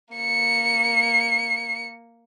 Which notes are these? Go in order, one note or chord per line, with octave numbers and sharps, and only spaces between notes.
A#3 C#7